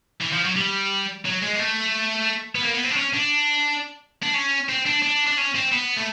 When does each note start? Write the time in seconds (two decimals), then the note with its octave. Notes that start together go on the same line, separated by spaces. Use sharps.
0.21 E3
0.33 F3
0.45 F#3
0.56 G3
1.25 F#3
1.42 G#3
1.55 A#3
1.59 A3
2.55 B3
2.63 A#3
2.74 B3
2.85 C4
2.91 D4
2.97 C#4
3.14 D4
4.23 D4
4.34 C#4
4.69 C4
4.86 D4
5.03 D4
5.27 D4
5.38 C#4
5.55 C4
5.72 B3
5.96 A3